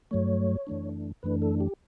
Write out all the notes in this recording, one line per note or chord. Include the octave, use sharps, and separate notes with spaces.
G2 F#3 A3 C#5
F#2 E3 A3 D4
F#2 E3 A3 D4 B4
A4
G4